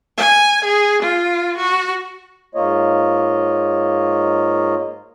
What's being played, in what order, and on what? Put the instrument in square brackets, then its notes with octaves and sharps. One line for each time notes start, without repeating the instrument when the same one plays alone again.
[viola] G#5
G#4
F4
F#4
[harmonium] G#2 A#3 F4 C#5 D#5